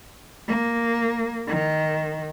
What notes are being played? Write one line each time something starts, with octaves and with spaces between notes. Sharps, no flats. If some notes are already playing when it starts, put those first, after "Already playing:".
A#3
D#3